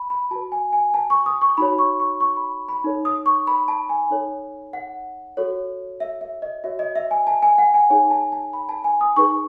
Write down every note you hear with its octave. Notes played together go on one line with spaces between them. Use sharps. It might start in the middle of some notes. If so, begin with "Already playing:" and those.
Already playing: B5
B5
F#4 B4 A5
G#5
G#5
A5
C#6
D#6
C#6
D#4 F#4 C#5 B5
C#6
C#6
C#6
B5
B5
D#4 A4 C#5
D#6
C#6
B5
A5
G#5
D#4 A4 C#5
F#5
F#4 A4 C#5
E5
E5
D#5
F#4 C#5 E5
D#5
E5
G#5
A5
G#5
F#5
G#5
D#4 G#4 C#5 G#5
A5
A5
B5
A5
G#5
D#6
D#4 G#4 B4 C#6